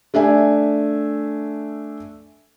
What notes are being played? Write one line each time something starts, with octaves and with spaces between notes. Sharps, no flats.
A3 D4 E5 G#5